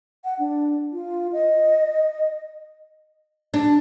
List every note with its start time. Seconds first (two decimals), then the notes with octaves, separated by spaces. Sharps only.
0.24 F#5
0.39 D4
0.93 F4
1.33 D#5
3.54 D4